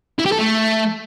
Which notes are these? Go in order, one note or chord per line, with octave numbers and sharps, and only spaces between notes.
E4
G4
A4
A3